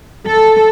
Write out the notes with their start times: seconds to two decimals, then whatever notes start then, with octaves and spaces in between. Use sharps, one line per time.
0.26 A4